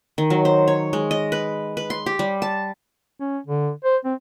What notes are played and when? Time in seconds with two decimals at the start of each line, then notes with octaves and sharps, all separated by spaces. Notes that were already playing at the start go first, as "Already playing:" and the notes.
0.18 D#3
0.30 F#3
0.45 C5
0.68 C#5
0.93 G#3
1.11 D#5
1.32 B4
1.77 B4
1.90 C6
2.06 G4
2.19 G3
2.42 A5
3.20 C#4
3.47 D3
3.84 C5
4.05 C4